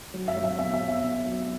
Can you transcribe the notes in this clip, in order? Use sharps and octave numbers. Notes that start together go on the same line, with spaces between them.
F#3
E5
F#3
E5
B2 E5
E5
B2
E5
B2
F#3